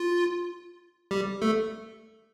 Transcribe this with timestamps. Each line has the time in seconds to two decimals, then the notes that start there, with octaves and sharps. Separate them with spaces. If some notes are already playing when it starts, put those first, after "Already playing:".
Already playing: F4
1.11 G3 G4
1.42 A3 A4